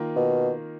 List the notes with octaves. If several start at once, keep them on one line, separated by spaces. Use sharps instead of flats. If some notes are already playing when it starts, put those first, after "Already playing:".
Already playing: D#3 A#3 F4
B2